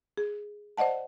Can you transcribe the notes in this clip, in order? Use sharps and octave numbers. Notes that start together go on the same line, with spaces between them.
G#4
C5 D5 D#5 F#5 A5